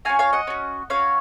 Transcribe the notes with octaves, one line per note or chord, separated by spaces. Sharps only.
C#4 F#4 F5 G#5
C#5 F5
D#5 F#5
C#4 F#4
C#4 F#4 C#5 F5